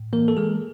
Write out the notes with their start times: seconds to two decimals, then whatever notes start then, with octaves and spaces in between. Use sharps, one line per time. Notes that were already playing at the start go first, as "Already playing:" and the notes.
Already playing: A2
0.13 E3 A#3 A#4
0.28 A4
0.37 E3 G#3 G#4